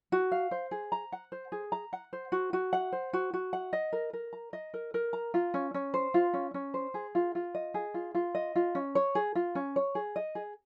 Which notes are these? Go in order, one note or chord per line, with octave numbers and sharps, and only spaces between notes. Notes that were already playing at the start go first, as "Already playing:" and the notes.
F#4
F5
C5
G#4
A#5
F#5
C5
G#4
A#5
F#5
C5
F#4
F#4
F#5
C5
F#4
F#4
F#5
D#5
A#4
A#4
A#5
D#5
A#4
A#4
A#5
F4
C#4
C#4
C5
F4
C#4
C#4
C5
G#4
F4
F4
D#5
G#4
F4
F4
D#5
F4
C#4
C#5
G#4
F4
C#4
C#5
G#4
D#5
G#4